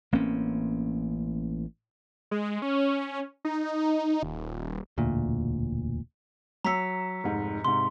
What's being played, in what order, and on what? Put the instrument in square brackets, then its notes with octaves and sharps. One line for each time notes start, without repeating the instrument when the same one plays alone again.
[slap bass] A1 A#3 C4 C#4
[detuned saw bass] G#3
C#4
D#4
D#1
[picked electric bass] E1 D2 A#2
[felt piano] F#3 E6 [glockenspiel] A#5 B6 C#7
[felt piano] F1 G#2
[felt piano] G#2 C3 [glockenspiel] C6